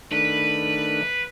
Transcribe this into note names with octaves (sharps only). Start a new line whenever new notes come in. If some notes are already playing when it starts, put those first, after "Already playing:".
D#3 A3 D4 B4